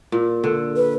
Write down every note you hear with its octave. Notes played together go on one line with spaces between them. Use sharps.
A#2
D3
B4